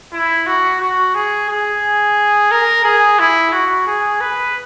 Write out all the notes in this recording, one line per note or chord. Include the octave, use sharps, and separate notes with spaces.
E4
F#4
F#4
G#4
G#4
A#4
G#4
E4
F#4
G#4
B4